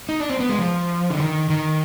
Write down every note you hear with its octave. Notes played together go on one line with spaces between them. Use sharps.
D#4
D4
C4
B3
G#3
F3
D3
D#3
D#3